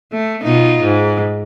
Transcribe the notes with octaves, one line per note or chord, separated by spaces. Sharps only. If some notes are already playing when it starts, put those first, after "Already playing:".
A3
B2 D#4 F4
G#2